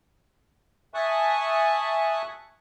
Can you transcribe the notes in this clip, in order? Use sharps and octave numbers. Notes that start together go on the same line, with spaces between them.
E5 G#5 A5 C#6 D#6 F#6